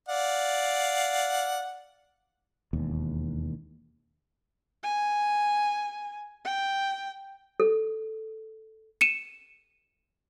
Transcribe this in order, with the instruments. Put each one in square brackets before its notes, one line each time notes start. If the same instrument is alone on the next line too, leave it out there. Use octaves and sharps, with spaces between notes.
[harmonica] D5 F5 F#5
[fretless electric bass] E1 D#2
[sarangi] G#5
G5
[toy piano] A4
[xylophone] C#7 D#7 E7